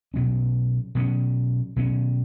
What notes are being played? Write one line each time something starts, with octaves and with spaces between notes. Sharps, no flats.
B2 F#3 C#4
B2 F#3 C#4
B2 F#3 C#4